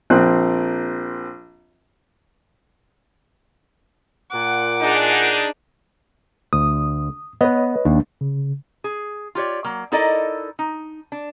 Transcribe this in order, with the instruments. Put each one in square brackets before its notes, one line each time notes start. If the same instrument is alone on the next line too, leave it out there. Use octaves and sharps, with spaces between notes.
[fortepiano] A#1 C4 F#6
[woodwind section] A#2 F#5 [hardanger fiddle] D6
[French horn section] D4 D#4 G#4
[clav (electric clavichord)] D2 [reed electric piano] D#6
[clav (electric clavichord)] B3 [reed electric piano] B4 C#5 D#5
[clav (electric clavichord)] D#2 [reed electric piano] D4
[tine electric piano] C#3
[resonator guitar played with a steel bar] G#4
F4 G4 C#5 D5
F#3 A#3
D#4 E4 A4 A#4 D5 D#5
D#4
D4